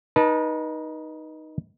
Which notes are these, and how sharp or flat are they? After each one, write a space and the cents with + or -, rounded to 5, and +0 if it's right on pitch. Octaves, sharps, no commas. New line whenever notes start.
D#4 +0 B4 -35 A5 +0